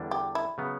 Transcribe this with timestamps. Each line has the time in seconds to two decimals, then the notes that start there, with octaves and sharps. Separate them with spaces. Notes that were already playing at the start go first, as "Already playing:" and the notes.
Already playing: E2 D3 G3 D4
0.11 G4
0.35 E4
0.58 C#3 F#3 B3